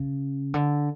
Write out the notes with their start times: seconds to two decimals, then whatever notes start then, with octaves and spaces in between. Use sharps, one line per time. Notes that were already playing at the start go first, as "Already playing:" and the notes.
Already playing: C#3
0.54 D3